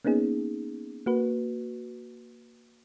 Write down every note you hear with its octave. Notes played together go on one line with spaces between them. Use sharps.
A#3 B3 C#4 D#4 G#4
A#3 F#4 B4